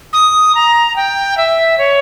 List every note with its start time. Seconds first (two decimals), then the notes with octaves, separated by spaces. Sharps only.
0.13 D#6
0.55 A#5
0.96 G5
1.37 E5
1.78 C#5